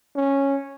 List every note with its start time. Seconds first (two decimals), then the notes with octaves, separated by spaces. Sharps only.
0.16 C#4